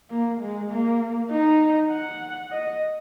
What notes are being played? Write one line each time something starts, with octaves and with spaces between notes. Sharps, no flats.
A#3
G#3
A#3
D#4
F#5
D#5